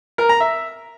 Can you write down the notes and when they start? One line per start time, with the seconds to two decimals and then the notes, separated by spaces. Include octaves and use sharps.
0.18 A#4
0.29 A#5
0.40 E5